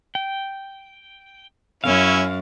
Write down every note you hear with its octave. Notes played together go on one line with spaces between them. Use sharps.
G5
F#2 C#4 E4 F5